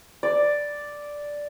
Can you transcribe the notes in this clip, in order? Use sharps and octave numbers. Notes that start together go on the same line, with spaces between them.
D5